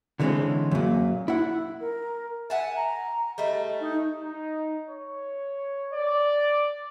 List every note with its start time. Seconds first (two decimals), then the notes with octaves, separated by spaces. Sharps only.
0.20 D3 E3 G#3 A#3 C4 C#4
0.71 F#2 A#2
1.28 E4 F#5
1.80 A#4
2.50 E5 F#5 G#5 A5
2.76 A#5
3.38 G3 A3 D#5
3.80 D#4
4.23 D#4
4.89 C#5
5.92 D5